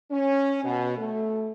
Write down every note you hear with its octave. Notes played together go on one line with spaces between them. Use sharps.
C#4
B2
A3